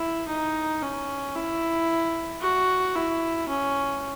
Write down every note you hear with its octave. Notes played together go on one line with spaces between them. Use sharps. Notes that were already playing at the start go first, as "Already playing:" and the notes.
Already playing: E4
D#4
C#4
E4
F#4
E4
C#4